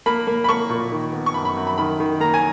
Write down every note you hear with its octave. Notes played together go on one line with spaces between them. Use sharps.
A#3 B5
A#3
B5
A#3 C#6
A#2
D#3
B3
C#6
F#2 B5
B5
F#2
B5
D#3 B5
D#3
A#3 A#5
G#5